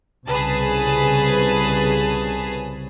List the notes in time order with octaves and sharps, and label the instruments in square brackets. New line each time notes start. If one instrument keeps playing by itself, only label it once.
[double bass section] C2 C#3 [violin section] G#4 B4 A5